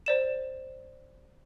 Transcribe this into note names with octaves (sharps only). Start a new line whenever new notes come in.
C5 D5 E7